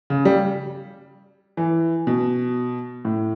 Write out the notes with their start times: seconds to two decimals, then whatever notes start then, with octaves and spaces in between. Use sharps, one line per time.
0.10 C#3
0.25 G3
1.57 E3
2.07 B2
3.05 A2